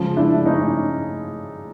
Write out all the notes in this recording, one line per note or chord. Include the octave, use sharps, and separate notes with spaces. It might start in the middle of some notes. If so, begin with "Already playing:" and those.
Already playing: C#3 F3 G#3
D4 E4
C#4 D#4